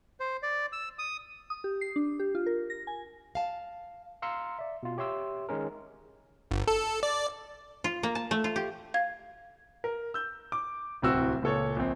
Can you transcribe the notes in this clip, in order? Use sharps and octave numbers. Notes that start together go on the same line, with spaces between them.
C5
D5
E6
D#6
D#6
G4
C7
D4
G4
F4
A#4
A#6
G#5
F5 A5
F5 A#5 C6 E6 C#7
D5 E5
B2 F4
G4 C#5 E5 C6 E6
D#3 G#3 C#4 A#4
G1
A4
D5
F4
A#3
A5
A3
F4
G4
F5 G#6
A#4
E6 G6
D6
D1 C2 C4 F#4 E6
C#2 A#2 A4 C#5
A#1 C4